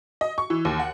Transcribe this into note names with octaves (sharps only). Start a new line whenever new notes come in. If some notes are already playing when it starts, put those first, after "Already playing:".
D#5
C#6
E3
D#2
F#5